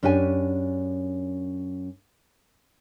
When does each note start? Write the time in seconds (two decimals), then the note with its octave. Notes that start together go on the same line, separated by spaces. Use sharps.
0.03 F#2 C#4 D4 G4 G#5